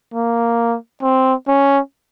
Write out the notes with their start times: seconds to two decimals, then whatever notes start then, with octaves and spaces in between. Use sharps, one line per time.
0.14 A#3
1.03 C4
1.48 C#4